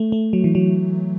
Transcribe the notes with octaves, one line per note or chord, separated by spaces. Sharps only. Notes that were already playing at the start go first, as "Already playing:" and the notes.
Already playing: A3
A3
F#3
E3
F#3